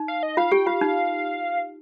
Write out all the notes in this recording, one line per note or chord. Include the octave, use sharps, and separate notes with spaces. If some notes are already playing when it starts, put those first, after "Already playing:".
Already playing: D#4
F5
D#5
F4 F5
G4 G5
F4 F5
D#4